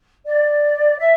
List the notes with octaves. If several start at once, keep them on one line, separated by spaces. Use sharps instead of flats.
D5
E5